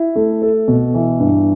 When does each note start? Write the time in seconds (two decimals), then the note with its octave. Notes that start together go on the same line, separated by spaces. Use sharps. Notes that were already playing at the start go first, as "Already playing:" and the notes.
Already playing: E4
0.16 A3
0.42 A4
0.68 B2
0.94 E3
1.20 G2